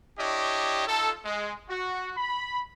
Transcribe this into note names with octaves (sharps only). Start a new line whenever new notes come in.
D4 E4 G4 C#5 D#5
D#4 F4 A4
G#3
F#4
B5